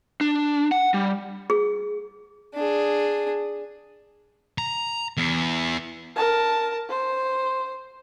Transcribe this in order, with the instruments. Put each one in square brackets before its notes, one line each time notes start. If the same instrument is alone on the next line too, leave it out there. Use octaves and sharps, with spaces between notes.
[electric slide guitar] D4
F#5
G3
[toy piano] G#4
[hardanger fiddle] D4 G#4
[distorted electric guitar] A#5
E2
[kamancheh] A#4 A5
C5